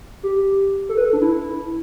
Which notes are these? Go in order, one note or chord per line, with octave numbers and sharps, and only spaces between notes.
G4
A4
B4
A4
D4
E4